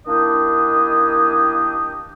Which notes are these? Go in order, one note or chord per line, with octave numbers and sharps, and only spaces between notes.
D#3 A#3 D4 E4 G4 D#5